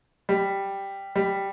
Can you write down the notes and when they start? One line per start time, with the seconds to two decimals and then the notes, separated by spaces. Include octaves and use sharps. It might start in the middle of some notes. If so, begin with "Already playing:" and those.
0.29 G3
1.16 G3